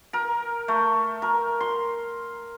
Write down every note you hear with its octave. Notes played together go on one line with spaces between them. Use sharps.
A#4
A3
A#4
C6